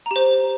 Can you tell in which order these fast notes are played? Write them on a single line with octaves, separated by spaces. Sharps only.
A#5 G4 C5